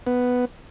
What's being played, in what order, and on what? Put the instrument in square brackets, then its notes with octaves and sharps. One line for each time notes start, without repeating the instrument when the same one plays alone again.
[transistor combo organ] B3